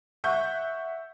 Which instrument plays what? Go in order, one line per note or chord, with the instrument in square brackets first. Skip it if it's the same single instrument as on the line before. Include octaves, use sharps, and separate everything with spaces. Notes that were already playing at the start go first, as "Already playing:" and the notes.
[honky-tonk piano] E5 F#5 C#6 G6